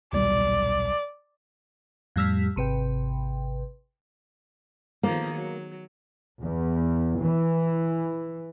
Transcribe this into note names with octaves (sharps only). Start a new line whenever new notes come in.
D#1 B1 G3 D5
F2 A2 G3 E6 F6 B6
G#1 C3 B4 G5
D#3 F3 A#3 G#4
F#3
E2
E3